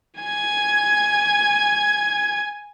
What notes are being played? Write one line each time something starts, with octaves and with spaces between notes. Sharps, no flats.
G#5 G#6